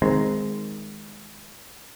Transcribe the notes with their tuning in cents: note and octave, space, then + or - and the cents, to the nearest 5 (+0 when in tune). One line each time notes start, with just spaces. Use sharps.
D#3 +0 G#3 +0 C4 -15